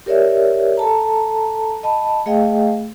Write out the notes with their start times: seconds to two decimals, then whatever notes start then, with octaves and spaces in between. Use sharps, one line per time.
0.06 G4 A#4 C#5 D5 E5
0.77 A4 A5 A#5
1.83 D#5 A5 B5
2.26 A3 G#4 D#5 F5 G5